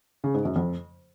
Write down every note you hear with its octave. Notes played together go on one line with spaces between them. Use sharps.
C#3
G#2
F#2
F2